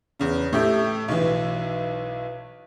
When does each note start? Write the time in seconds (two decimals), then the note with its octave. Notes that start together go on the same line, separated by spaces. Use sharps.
0.19 E2 C#3
0.53 A2 A3 G4 E5
1.08 B1 E3